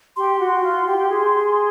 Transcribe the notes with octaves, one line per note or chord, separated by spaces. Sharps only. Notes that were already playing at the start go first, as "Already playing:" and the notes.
G4 C6
F#4
F4
G4
G4
G#4